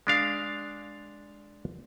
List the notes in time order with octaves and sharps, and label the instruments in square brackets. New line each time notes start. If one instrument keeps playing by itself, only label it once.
[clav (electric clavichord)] G#3 D4 F5